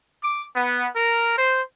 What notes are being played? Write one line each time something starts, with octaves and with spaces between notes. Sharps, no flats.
D6
B3
A#4
C5